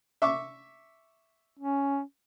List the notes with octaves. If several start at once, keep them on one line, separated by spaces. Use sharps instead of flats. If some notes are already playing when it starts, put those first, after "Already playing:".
E5 C#6 D6
C#4